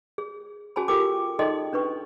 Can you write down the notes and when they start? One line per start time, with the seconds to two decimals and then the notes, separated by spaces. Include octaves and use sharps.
0.18 G#4
0.76 C#4 F#4 G#4 G#5 A5 B5
0.88 F4 G4 A4 A#4 G5 D6
1.39 D#4 G#4 A4 D#5 G5 C6
1.73 C#4 D4 B4 C#6